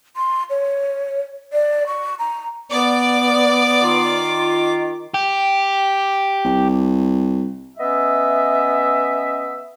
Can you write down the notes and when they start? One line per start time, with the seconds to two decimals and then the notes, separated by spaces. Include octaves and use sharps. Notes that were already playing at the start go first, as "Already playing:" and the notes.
0.16 C6
0.50 C#5
1.53 D5
1.86 C#6
2.19 A#5
2.72 B3 D5 D6
3.82 D#3 F4
5.14 G4
6.45 C2
7.77 B3 C#4 D#5 E5